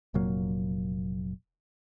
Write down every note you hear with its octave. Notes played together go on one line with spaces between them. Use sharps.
F1 A#2 F#3 A#3